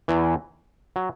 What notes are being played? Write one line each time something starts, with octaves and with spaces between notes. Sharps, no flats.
E2 E3
F#3